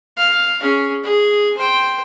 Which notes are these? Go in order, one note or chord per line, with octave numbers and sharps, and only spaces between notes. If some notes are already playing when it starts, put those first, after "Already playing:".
F5
C#4 G#4
G#4
C5 G5